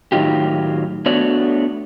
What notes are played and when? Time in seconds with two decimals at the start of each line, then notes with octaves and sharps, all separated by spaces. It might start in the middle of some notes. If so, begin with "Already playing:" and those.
0.12 A2 D#3 F#3 D#4 F4 G4
1.06 A3 B3 D4 F#4 C#5 D5